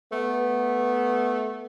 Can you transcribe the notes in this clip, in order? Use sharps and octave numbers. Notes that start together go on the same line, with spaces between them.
A3 B3